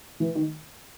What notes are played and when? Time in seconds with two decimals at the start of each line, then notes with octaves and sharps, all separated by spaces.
0.20 E3
0.35 D#3